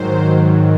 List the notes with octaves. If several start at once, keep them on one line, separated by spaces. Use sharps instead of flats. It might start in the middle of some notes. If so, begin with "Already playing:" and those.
Already playing: G#2 D#3 F#3 C5